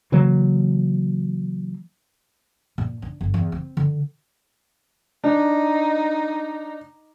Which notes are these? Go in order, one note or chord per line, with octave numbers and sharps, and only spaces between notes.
C#3 E3 F#3 A#3
A#2
D4
G1
E2
C4
D3
D4 D#4